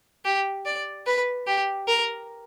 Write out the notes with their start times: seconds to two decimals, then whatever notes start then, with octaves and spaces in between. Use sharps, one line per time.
0.25 G4
0.66 D5
1.07 B4
1.47 G4
1.88 A#4